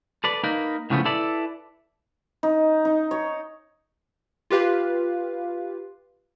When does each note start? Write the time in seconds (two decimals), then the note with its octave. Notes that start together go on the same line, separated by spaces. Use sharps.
0.24 A4 B4 D5
0.44 A#3 D#4 A#4 B4
0.90 A2 C#3 F3 A3 B3
1.05 E4 A4 B4 D5
2.43 D#4
2.85 D#4
3.11 C#5
4.50 F4 G4 B4 F5